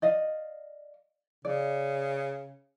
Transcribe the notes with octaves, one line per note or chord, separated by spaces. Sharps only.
D5 D#5 F5
C#3 D5